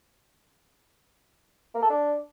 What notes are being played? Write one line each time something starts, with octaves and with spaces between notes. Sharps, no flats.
A#3
A4
D4